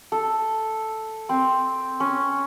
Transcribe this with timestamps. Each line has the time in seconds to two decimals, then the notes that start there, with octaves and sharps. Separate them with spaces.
0.12 A4
1.29 C4
2.00 C#4